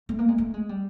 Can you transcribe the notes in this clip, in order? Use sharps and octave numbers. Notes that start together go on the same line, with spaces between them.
A3
A#3
G#3
A3
G#3
G3